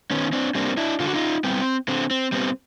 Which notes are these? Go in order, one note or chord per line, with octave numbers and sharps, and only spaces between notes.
D#3 B3 C#4
C4 D4
G3 A#3 C4 D4
D4 E4
D3 F4
F#4
D#4 F4
G3 B3 C4
D3 C4
C4
G3 B3 C4